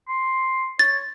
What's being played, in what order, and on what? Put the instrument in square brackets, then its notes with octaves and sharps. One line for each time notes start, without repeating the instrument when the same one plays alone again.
[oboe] C6
[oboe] C#5 [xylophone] A6